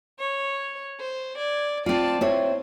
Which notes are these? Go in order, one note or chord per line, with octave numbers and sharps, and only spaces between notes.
C#5
C5
D5 G#6
C4 F4 D5 A5
C4 E4 C5 C#5